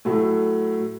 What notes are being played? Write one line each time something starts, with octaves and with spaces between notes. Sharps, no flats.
A2 F#3 A3